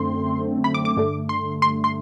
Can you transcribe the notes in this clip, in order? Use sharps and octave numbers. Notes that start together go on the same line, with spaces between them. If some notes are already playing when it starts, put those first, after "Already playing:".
Already playing: F#2 D3 A3 C4 C6
B5
D6
D6
G2 D3 A3
C6
C6
C6